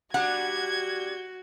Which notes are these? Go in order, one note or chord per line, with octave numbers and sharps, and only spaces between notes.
G3 D4 F#4 F#5 G#6